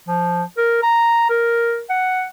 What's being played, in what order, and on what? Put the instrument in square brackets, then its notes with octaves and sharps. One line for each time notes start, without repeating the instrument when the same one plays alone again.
[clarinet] F3
A#4
A#5
A#4
F#5